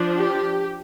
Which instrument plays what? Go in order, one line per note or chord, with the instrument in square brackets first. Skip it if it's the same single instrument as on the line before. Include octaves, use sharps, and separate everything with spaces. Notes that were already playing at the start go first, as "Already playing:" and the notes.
Already playing: [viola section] F3 D4
G4